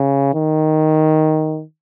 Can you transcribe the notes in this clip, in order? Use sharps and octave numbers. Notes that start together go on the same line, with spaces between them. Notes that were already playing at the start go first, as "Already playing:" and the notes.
Already playing: C#3
D#3